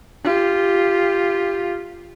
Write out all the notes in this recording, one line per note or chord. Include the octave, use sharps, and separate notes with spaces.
F4 G4